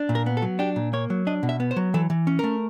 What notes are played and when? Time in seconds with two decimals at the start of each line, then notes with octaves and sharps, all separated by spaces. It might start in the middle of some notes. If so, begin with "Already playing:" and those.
Already playing: D4
0.09 A#2
0.15 A#4
0.26 B3
0.37 A4
0.42 F#3
0.59 D4 G4
0.76 A#2
0.93 A#3 C#5
1.10 F#3
1.27 D4 D#5
1.43 B2
1.49 E5
1.60 B3
1.71 C5
1.76 F#3
1.94 E3 A4
2.10 E3
2.27 C#4
2.39 A3 A#4